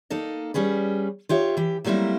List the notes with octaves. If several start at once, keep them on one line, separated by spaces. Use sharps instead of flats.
A#3 D#4 A4 D#5
G3 C#4 G#4 B4
F4 G4 C#5 E5
E3 G4
F#3 G3 A3 A#3 C4 E4